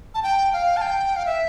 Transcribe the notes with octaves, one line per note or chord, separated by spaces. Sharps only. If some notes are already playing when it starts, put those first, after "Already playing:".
A5
G5
F5
A5
G5
F5
E5